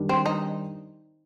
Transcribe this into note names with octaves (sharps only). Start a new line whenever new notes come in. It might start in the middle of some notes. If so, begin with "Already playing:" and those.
Already playing: D#3 G3 D4
C4
D#4